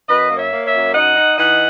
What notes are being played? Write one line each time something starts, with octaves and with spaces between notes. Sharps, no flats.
F#2 B4 D#5
A#3
C#5 E5
A#3
C#5 E5
F#2
D#4 D#5 F#5
D#4
E3 D#5 F#5